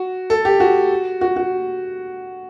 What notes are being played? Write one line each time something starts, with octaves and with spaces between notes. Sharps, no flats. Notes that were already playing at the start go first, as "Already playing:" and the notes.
Already playing: F#4
A4
G4
F#4
F#4
F#4